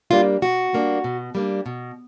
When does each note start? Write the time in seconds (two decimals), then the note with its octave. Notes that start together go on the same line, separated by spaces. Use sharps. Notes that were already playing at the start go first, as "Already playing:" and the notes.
0.11 G3 A#3 D4 F4
0.42 B2 F#4
0.73 G3 A#3 D4
1.04 B2
1.35 G3 A#3 D4
1.66 B2